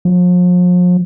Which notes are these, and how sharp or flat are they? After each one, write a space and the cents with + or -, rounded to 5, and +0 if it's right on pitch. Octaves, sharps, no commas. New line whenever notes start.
F3 +40